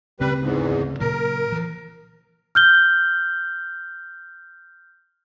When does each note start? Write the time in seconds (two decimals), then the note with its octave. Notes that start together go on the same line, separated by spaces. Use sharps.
0.20 D2 C#3 G3 C4 B4
0.42 E2 G#2
1.00 A#2 C#3 F#3 A#4
1.52 E3 F3
2.55 F6 G6 G7